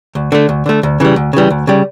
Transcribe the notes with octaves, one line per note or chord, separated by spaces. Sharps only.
D2
D3 A3
D2
D3 A3
D2
C#3 E3 G3
D2
C#3 E3 G3
D2
C#3 G3